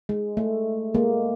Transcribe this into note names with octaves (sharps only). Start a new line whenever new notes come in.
G#3
A3
G#3 A#3